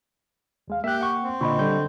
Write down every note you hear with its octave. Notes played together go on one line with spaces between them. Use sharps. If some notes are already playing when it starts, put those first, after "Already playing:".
D#2 G#3 F5
A#3 G4 E5 F#6
F#5 C#6
C4
A#2 D3 D#5 B5 C#6
D3 G3 G6